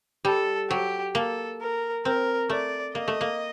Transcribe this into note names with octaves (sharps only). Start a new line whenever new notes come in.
G3 A4
F#3 G4
A#3 A4
A#4
C4 A#4
A3 D5
A#3 D#5
A3
A#3